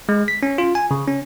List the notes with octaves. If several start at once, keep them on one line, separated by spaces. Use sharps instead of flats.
G#3
B6
C#4
F4
G#5
C#3
C#4